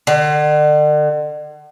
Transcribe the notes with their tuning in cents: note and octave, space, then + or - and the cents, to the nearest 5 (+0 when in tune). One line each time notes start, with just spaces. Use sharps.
D3 +40